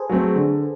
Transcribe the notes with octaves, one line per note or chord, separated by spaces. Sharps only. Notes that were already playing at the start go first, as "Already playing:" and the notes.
Already playing: G#4 A4 B4 C5
F#3 A3 C4
D3